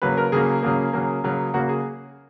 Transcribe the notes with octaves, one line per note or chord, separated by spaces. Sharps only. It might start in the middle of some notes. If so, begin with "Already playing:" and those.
C#3 F#3 A#3 B4
A#4
C#3 F#3 A#3 G#4
C#3 F#3 A#3
C#3 F#3 A#3
C#3 F#3 A#3
C#3 F#3 A#3 F#4
G#4